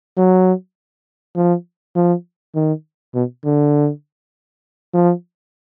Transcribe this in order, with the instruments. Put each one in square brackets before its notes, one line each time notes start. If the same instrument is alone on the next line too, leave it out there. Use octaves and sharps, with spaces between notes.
[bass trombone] F#3
F3
F3
D#3
B2
D3
F3